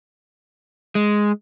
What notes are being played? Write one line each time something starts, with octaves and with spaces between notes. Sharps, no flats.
G#3